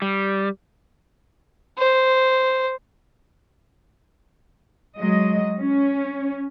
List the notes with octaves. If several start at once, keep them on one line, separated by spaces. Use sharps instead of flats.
G3
C5
F#3 G#3 D#5
C#4